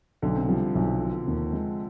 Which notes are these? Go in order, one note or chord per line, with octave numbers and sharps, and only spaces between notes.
B1 D3
C3
F3 G3
B1
B2
D#2
G#3